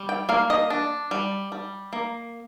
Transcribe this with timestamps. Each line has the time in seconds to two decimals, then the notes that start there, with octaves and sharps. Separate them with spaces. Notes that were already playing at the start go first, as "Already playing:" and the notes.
Already playing: G3
0.09 G5
0.29 A#3 F5
0.50 D#5
0.70 D4
1.11 G3
1.52 G3
1.93 A#3